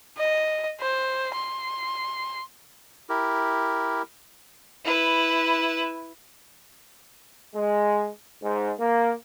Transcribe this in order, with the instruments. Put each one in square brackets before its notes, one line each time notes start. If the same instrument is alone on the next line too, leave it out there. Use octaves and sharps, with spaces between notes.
[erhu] D#5
C5
C6
[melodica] E4 G4 A#4
[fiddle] E4 B4
[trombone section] G#3
G#2
A#3